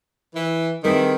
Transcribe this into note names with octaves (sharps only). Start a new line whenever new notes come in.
E3
D#3 G3 C4 E4 G#4 B4